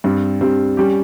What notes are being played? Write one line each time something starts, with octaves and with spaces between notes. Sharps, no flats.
G2 G3 C4
G2 G3 C4
G3 C#4 G4